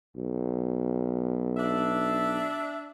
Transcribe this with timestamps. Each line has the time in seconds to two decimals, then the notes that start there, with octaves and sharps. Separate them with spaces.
0.17 B1
1.57 D4 E5